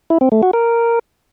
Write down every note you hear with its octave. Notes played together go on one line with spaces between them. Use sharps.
E4
C4
A3
F#4
A#4